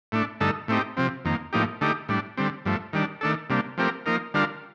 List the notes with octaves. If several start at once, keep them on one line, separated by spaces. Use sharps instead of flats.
A2 A3 D4
G2 D3 A3 D#4 A4
A2 A3 C4 D#4 G4
C3 F3 C4
F2 D#3 A#3
A2 F3 A#3 D#4 G4
D3 A3 D#4 G4
A2 G3 D4
D3 G3 C4
G2 F3 A3
D#3 G3 D4
D#3 A3 D4 A4
C3 G3 A#3 D4
F3 A3 C4 G4 A#4
F3 A#3 D#4 A#4
D3 G3 D4 F4 A#4